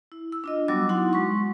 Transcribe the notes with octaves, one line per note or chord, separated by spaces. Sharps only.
E4
E6
D4 F4 D#5
F#3 G3 B3 F#4 D6 E6
D#4 E4 F#4 F#5 C6
G#3 C6 C#6